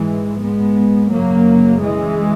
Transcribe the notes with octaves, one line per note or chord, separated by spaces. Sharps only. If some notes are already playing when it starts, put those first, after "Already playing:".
Already playing: G#2 E3 G#3
G#3 B3
F#2 C#3 F#3 A#3
E3 G#3